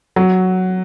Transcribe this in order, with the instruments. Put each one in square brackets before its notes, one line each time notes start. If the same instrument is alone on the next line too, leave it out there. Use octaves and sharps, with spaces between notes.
[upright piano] F#3